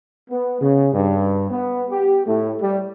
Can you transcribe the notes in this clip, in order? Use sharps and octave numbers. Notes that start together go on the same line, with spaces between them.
B3
C#3
G2
B3
G4
A2
G3